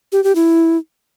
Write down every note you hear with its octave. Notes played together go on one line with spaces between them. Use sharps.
G4
G4
E4